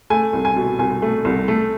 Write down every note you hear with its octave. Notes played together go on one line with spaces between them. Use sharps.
A3 G#5
C2
G#5
B2
C2 G#5
A3
C2
A3